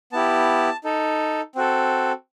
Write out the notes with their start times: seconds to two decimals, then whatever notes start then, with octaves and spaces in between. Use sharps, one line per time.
0.12 B3 E4 G4 A5
0.84 D#4 A4
1.55 C4 F#4 A4